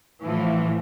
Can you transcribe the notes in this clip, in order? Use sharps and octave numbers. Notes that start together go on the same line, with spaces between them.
A2 E3 F3